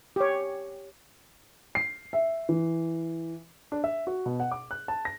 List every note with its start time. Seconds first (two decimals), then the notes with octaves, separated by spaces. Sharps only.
0.16 G4 C#5
1.75 C7
2.13 E5
2.49 E3
3.72 D4
3.84 E5
4.07 F#4
4.26 B2
4.40 F#5
4.51 D6
4.71 F#6
4.88 A5
5.05 A#6